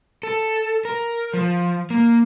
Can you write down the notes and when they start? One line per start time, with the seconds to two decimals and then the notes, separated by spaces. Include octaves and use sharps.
0.23 A4
0.85 A#4
1.34 F3
1.90 A#3